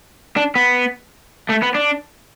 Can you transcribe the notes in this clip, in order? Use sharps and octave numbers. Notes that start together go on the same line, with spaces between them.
D4
B3
A3
B3
D4